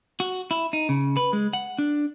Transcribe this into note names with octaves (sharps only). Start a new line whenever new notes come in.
F#4
E4
D#4
C#3
B4
G#3
F#5
D4